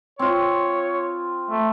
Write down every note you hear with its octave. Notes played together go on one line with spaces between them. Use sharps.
C4 F4 C#5
A3